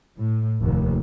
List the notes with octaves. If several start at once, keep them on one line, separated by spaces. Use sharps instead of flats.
A2
F1 D#2